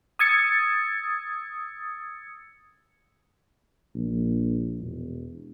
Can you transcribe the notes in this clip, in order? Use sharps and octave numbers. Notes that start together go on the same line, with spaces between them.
D#6 E6 G#6 A6 C#7
A#1
E1